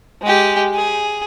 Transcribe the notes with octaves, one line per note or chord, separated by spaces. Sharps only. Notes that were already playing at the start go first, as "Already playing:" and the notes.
G#3 G4
G#4